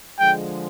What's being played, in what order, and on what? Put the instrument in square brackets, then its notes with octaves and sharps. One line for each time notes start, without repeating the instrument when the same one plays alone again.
[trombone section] D3 F3 G#3 [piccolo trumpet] G5